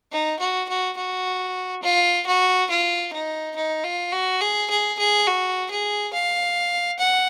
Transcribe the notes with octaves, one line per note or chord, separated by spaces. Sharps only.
D#4
F#4
F#4
F#4
F4
F#4
F4
D#4
D#4
F4
F#4
G#4
G#4
G#4
F#4
G#4
F5
F#5